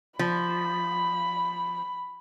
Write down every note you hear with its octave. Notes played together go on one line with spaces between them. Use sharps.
F3 B5